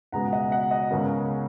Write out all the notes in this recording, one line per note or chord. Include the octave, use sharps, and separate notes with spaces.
C#2 B2 G#3 B3 F#5 A#5
D#5 F#5
D#5 F#5
D#5 F#5
C#2 C#3 G#3 B3 A#4